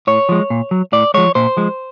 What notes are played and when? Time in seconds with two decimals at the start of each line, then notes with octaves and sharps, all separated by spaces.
0.07 A2 C#5
0.29 F3 G#3
0.50 A#2
0.71 F#3
0.93 A2 D5
1.14 F3 G#3 C#5
1.35 A#2 C5
1.57 F3 G#3